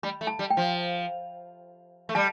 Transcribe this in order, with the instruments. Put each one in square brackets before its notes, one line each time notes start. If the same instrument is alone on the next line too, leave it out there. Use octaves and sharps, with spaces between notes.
[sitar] G3 [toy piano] B5
[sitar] A3
[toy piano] A5
[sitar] G3
[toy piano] G5
[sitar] F3
A3
[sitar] G3 [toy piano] A5